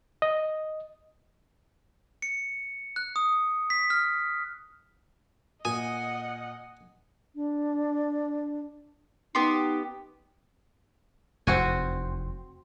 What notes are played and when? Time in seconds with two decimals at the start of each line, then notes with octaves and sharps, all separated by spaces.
0.22 D#5
2.22 C#7
2.96 F#6
3.16 D#6
3.70 B6
3.90 F6
5.65 A#2 D#5 F#5 G#5 D#6
7.35 D4
9.35 B3 D#4 G4 C6
11.47 F1 E2 C4 F#4 G#5